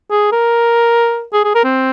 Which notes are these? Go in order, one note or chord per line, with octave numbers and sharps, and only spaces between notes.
G#4
A#4
G#4
G#4
A#4
C4